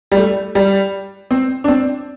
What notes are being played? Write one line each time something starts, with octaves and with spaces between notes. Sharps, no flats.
G3
A3
G3
C4
D4
C4